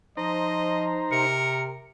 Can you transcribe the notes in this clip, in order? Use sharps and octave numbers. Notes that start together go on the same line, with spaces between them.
F3 D#4 C5 D#5 A#5
C3 A#4 C#7